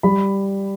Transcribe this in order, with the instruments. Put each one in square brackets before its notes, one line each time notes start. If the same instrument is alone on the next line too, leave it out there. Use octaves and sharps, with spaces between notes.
[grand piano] G3 B5